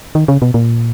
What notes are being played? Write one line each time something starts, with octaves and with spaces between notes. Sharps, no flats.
D#3
C#3
B2
A#2